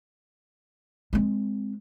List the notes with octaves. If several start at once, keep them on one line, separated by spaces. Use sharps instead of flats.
G#3 C4